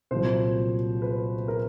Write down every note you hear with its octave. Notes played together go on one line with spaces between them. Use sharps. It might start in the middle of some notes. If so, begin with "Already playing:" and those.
C2 A#2 F#3 C5
B4
A#4